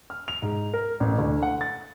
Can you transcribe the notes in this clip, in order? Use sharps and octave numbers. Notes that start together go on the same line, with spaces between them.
F6
F7
G#2
A#4
A1
D2
F#5
A6